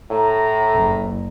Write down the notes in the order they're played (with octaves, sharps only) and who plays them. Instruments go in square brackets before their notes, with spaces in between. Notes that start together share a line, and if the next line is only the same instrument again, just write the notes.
[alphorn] A2 [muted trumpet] A#5
[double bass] F#1